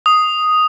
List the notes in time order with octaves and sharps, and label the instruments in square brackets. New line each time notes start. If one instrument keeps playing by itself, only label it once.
[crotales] D#6